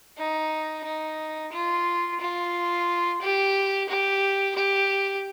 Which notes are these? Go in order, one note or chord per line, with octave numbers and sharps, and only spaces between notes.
D#4
D#4
F4
F4
G4
G4
G4